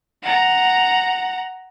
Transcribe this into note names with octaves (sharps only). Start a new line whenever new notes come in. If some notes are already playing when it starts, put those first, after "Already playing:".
F#5 A#5